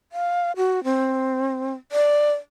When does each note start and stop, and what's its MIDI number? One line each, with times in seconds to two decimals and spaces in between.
0.12 0.52 77
0.57 0.84 66
0.84 1.73 60
1.92 2.32 74